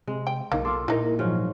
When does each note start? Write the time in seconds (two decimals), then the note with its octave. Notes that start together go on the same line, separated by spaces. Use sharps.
0.07 C3 G#3
0.27 G5
0.52 B1 C#3 A#3 D#4
0.65 F4 A4 C6 D6
0.88 A#2 G#3 D#4 E4 A#4
1.19 G#2 F3 F#3 C#4 F4